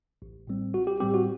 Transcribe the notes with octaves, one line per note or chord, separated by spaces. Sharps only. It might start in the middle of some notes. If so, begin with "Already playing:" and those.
A1
A2 G3 C4
A1 F#4
G4
A2 G3 C4 G4
F#4